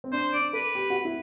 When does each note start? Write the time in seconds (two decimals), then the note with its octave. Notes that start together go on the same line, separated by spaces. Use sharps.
0.04 C4
0.12 D4 C5
0.33 D4 D5
0.53 A4 B4
0.75 G4
0.90 F#4
1.05 E4